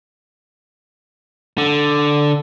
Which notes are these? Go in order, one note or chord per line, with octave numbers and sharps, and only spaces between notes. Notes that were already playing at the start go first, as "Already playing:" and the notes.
D3